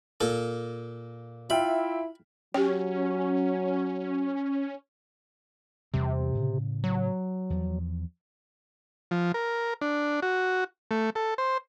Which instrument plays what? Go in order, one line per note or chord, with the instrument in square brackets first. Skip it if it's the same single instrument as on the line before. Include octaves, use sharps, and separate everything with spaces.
[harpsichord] A#2 A4
[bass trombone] E4 [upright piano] F4 E5 G5 [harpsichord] B5
[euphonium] F#3 [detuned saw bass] C#4 [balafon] G4 G5
[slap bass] E2 G3 C4 [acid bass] C3
[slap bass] A2 C#3
[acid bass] F#3
[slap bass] E2 F3
[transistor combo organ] F3
A#4
D4
F#4
A3
A4
C5